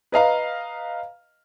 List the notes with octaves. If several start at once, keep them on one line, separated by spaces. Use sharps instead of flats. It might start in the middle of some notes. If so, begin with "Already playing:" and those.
B4 D#5 F5 A#5